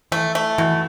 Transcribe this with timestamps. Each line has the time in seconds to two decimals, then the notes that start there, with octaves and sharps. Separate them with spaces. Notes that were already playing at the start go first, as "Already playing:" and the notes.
0.12 E3 A3
0.35 A3
0.58 B2 E3